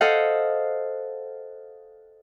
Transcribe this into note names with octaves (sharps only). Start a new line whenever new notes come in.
A4 C5 D#5 F5 F#5